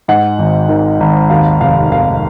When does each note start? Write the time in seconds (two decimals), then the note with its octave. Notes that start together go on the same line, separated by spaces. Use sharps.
0.08 G#2 F#5
0.39 G#1
0.69 D#3
1.00 G#1
1.30 D#2 F5
1.61 F1 F5
1.91 D#3 F5